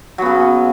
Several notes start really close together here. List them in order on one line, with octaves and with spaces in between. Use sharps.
F#3 B3 C#3